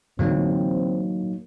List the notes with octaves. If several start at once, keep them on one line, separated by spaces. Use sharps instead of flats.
A2 D3 E3 F#3 A#3 C4 D#4